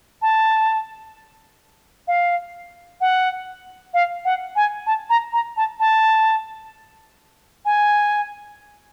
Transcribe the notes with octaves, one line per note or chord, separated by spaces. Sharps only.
A5
F5
F#5
F5
F#5
G#5
A5
A#5
A#5
A5
A5
G#5